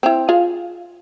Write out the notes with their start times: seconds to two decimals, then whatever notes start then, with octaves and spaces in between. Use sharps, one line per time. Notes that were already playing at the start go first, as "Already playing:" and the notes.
0.03 C4 E4
0.29 F4 G#4 F5